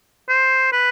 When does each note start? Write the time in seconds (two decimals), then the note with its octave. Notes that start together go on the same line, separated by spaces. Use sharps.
0.29 C5
0.73 B4